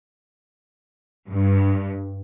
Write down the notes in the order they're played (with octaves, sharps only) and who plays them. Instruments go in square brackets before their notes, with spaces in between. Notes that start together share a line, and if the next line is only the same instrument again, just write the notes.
[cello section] G2